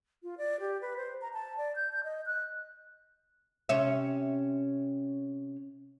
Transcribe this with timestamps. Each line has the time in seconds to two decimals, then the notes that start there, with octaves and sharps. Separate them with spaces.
0.23 F4
0.38 D5
0.60 G4
0.81 B4
0.97 C5
1.21 A#5
1.33 A5
1.57 D5
1.76 G6
1.92 G6
2.04 D#5
2.26 F#6
3.69 C3 C#4 E5